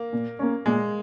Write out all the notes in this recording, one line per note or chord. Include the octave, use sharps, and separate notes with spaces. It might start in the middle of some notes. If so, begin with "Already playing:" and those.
Already playing: A#3
A#2
A#3 C#4
A#2 G#3